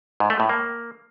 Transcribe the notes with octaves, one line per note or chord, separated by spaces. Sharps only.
G#2
A3
A2
A#3